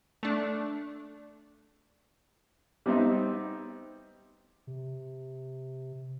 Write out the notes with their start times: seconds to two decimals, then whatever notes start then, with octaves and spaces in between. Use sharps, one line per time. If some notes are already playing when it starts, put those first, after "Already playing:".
0.23 A3 D4
2.86 G3 B3 C4 D#4 E5
4.67 C3